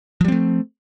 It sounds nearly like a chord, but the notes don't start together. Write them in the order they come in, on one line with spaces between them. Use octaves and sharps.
F3 G3 C4 A3